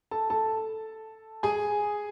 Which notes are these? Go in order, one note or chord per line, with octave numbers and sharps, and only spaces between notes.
A4 A5
A4 A5
G#4 G#5